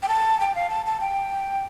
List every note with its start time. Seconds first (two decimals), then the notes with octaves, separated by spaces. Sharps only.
0.03 G5
0.08 A5
0.40 G5
0.55 F5
0.70 A5
0.86 A5
1.01 G5